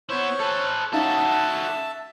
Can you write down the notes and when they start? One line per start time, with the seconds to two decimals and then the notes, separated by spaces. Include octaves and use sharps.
0.09 B3 E4 C5 C#5
0.39 A4 B4
0.93 C#4 D#4 F#4 A4 E5 F5 A5